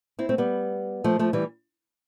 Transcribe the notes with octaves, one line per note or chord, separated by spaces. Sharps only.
C4 E4
A3 C4
G3 B3
F3 A3
F3 A3
E3 G3